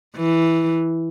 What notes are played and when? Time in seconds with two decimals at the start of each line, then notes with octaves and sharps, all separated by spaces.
0.16 E3